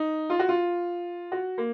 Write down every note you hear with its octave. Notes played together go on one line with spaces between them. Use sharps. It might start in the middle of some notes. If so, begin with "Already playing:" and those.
Already playing: D#4
F4
F#4
F4
F#4
A#3